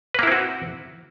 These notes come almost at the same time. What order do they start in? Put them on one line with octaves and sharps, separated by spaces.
B4 A#3 E4 C4 F#4